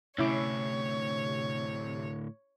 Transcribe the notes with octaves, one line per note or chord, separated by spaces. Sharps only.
D2 A2 C3 C#4 E4 C#5 D6